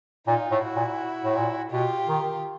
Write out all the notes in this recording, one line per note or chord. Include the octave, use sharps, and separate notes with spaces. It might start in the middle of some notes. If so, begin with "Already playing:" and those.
A#2 D#4 F4
A2
E4 F#4
A#2
A2
A#2
B2 F4 G4
D#3